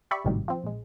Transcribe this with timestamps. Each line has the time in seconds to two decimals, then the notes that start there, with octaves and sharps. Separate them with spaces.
0.11 G4 D5 E5 B5 C#6
0.25 G#1 A2 C3 D#3 F#3 G3
0.48 F3 C4
0.64 A#1 G#3